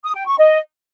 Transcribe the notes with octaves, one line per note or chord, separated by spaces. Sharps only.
D#6
G5
C#6
D#5